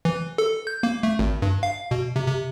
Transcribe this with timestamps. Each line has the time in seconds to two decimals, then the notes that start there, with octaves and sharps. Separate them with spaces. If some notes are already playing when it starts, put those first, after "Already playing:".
0.05 E3
0.38 A4
0.67 G6
0.83 A#3
1.03 A3
1.19 G#1
1.42 G2
1.63 F5
1.91 B2
2.16 C3
2.27 C3